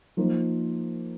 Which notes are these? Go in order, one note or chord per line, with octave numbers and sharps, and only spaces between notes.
F3 A#3 D#4